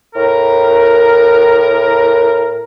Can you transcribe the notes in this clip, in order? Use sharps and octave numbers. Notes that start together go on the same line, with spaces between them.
A2 A#4